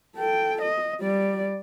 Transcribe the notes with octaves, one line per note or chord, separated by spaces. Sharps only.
A4 G5
D#5
G3 D5